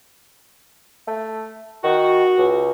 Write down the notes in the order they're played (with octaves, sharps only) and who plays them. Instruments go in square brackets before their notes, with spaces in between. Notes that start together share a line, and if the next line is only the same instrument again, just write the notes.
[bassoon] A3
[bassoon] D#3 [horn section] F#4
[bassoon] C#2